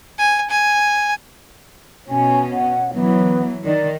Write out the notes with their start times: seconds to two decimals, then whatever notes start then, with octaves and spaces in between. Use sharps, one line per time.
0.18 G#5
0.50 G#5
2.09 B2 C#4 G#5
2.51 F#5
2.93 E3 F#3 B3
3.65 D#3 D5